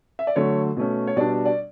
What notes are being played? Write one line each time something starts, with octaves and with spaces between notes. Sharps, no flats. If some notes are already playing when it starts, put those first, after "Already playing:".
E5
D5
D3 F#3 A3 C#5
B2 A3 C#4
C#5
B2 G3 D4 D5
D5